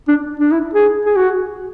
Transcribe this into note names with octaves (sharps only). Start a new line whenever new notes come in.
D4
D4
E4
G#4
G#4
F#4